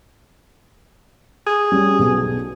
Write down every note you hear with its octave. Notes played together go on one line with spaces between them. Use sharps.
G#4
G3 C#4 G4
B1 B2